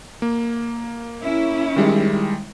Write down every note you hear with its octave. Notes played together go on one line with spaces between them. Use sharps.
A#3
C#4 E4
D#3 G3 G#3